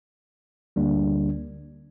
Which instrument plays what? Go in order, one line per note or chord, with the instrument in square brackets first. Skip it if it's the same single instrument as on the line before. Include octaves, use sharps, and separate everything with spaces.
[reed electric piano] D2 D3 G3 A#3 D4